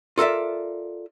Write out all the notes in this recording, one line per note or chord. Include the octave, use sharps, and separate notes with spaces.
F4 A4 A#4 D5 E5